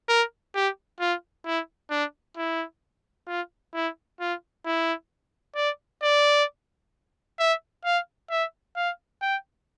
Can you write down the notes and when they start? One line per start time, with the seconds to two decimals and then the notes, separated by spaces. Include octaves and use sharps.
0.09 A#4
0.55 G4
1.00 F4
1.46 E4
1.91 D4
2.37 E4
3.28 F4
3.74 E4
4.20 F4
4.66 E4
5.56 D5
6.03 D5
7.39 E5
7.85 F5
8.30 E5
8.76 F5
9.22 G5